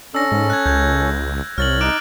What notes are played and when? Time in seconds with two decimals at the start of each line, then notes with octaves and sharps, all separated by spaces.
0.14 C#4 D4 A4 E6 A#6
0.32 G#2
0.50 F#6 G#6
0.66 C#2 G6 G#6
1.58 C2 C#5 F6 A6 F#7
1.81 D#4 D6 F#6 D7